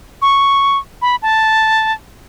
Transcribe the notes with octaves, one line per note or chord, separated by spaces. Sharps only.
C#6
B5
A5